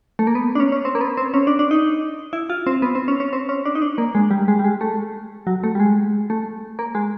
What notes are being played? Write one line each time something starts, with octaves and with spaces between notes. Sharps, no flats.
A3
A#3
B3
D4
C#4
C#4
C4
A#3
B3
C4
C#4
D4
D4
D#4
E4
F4
C4
B3
C4
C#4
C#4
C4
C#4
D4
D#4
D4
A#3
G#3
G3
G#3
G3
G#3
A3
F#3
A3
G3
G#3
A3
A#3
G#3